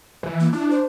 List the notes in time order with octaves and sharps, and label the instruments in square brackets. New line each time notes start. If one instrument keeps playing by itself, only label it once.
[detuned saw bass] E3
[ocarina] A#3
[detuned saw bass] D4 [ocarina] E4
[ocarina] C5